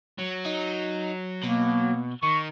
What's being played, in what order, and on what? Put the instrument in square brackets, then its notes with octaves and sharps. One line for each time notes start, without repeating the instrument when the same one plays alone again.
[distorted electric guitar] F#3
[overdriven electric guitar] D#4
[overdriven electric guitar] B2 [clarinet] A#3
[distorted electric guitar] D#3 [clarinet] C#6